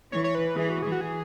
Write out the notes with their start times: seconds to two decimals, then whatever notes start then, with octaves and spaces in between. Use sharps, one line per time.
0.12 E3 C#5
0.24 C#5
0.35 B4
0.56 E3 G#4
0.69 F#4
0.82 E3 G#4
0.92 F#4
1.01 G#4